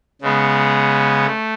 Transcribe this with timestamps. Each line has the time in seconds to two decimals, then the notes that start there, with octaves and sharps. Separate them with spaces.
0.21 C#3 G#3 B3
1.26 A3